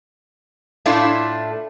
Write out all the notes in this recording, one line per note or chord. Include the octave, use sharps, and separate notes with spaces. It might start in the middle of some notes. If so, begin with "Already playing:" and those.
A2 A3 D4 E4 F4